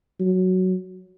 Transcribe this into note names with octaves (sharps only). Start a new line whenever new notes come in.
F#3